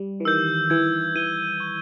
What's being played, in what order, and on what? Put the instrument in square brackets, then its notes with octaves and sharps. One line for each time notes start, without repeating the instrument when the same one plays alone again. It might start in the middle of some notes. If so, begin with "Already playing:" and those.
Already playing: [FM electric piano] G3
E3
[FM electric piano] D#3 [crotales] E6 G6
[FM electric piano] E3 [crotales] G#6
[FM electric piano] E3 [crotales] D#7 G7
[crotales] C#6